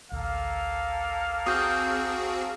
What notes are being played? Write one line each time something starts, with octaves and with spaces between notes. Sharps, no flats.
A1 D2 A#3 A4 F5
C4 F#4 G#4 D#6 G6